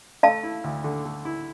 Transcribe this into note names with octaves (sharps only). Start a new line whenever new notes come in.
A3 F5 A5
E4
D2
D3
A3
E4